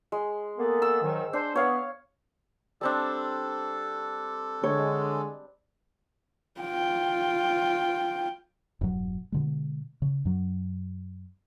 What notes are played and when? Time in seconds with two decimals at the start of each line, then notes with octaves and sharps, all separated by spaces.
0.12 G#3
0.58 A#3 B3 A4
0.82 E6
1.02 G#2 D#3 F#3
1.33 D4 C5
1.55 B3 C#5 F5
2.81 G3 C4 D4 A4
4.63 D3 G#3 C#5
6.60 F4 G5
8.81 E1 G2 F#3
9.32 B2 D3 G#3
10.02 C#3
10.25 F#2 F#3